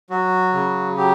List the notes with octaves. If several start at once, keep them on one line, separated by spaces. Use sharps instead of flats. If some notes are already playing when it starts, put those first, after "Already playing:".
F#3 F#4
C#3
F#3 G4